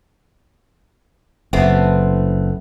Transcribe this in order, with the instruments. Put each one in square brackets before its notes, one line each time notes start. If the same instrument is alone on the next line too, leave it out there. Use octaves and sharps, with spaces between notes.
[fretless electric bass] F#1 [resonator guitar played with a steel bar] A3 B3 C4